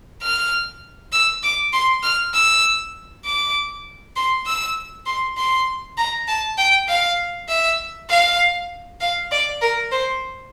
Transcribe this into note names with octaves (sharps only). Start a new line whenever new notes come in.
F6
E6
D6
C6
F6
E6
D6
C6
E6
C6
C6
A#5
A5
G5
F5
E5
F5
F5
D5
A#4
C5